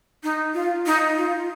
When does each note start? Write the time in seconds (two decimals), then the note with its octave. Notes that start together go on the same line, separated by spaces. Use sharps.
0.23 D#4
0.54 F4
0.86 D#4
1.17 F4